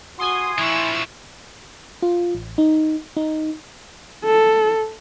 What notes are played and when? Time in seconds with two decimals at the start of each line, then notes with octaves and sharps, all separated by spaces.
0.19 F#4 G#5 C6 D#6
0.58 F3 D4 E4 C#6 E6
2.02 F4
2.35 A1
2.58 D#4
3.17 D#4
4.25 A4